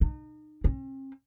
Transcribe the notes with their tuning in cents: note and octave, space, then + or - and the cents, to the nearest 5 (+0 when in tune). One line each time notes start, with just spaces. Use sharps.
D#4 -35
C4 +45